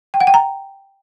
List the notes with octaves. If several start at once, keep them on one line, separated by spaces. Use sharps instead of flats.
G5
F#5
G5
A#5